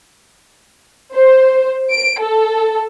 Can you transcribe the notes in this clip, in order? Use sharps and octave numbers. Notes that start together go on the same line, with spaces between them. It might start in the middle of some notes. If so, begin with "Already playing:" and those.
C5
D7
A4